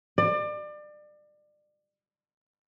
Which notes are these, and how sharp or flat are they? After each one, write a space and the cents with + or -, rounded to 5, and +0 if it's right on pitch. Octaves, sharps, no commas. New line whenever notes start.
D5 +30